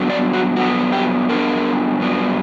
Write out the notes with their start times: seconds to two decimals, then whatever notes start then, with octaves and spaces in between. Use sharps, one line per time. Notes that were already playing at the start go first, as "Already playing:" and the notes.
Already playing: G2 F#3 B3 D4
0.10 D5
0.33 F#4
0.56 G2 F#3 B3 D4 F#4
0.92 G4
1.29 G2 F#3 B3 D4 A#4
2.00 G2 F#3 B3 D4